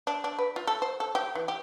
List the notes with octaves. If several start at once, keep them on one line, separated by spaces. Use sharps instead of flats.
D4
D4
B4
F4
A4
C5
A4
G4
E3
G4